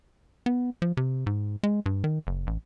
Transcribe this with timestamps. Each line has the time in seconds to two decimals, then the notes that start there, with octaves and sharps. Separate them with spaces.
0.46 B3
0.82 F3
0.97 C3
1.27 G#2
1.63 G#3
1.86 G2
2.04 D#3
2.27 F#1
2.47 A1